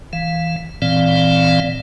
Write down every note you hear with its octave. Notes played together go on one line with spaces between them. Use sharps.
E3 F5
A#2 E3 C4 D5 F5